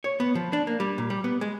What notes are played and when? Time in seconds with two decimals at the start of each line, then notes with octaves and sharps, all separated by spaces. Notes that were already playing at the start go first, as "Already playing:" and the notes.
0.04 C#5
0.20 B3
0.35 F3
0.53 D4
0.67 A#3
0.80 G3
0.98 A#2
1.10 G3
1.24 B3
1.41 G#3